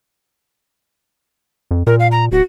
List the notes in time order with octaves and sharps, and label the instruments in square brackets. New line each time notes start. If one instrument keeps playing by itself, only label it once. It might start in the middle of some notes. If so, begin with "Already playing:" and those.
[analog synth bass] F2
[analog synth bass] A#2 [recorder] A#4
[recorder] F5
A#5
[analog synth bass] D1 [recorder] F#4